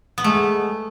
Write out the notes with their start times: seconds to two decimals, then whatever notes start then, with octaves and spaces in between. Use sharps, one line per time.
0.18 B3
0.24 G#3 A3